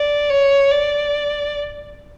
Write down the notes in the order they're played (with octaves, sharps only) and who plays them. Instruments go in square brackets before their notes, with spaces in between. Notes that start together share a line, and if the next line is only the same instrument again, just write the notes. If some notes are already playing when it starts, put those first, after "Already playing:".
Already playing: [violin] D5
C#5
D5